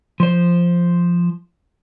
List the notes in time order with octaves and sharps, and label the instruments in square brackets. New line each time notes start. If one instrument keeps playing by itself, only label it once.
[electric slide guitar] F3 C5